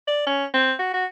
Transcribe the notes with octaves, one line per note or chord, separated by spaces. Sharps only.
D5
C#4
C4
F#4
F#4